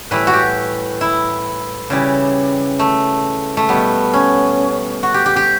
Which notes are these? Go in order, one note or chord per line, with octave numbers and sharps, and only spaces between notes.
A2 E3 G3 B4
F#4
G4
E4
C#3 E3 G3
A3
A3
B2 G3 B3
C#4
F#4
G4
G4
G4